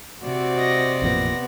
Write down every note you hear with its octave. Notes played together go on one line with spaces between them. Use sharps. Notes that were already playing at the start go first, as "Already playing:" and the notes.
C3 C4 F#4 D5
D#5 A#6
A1 F2 A#2 B3 A#6